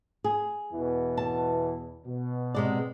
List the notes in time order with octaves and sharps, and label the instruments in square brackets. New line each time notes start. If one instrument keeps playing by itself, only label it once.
[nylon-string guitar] G#4
[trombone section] E2 B2 E3
[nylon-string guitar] A5
[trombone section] B2
[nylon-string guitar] C3 G#3 D5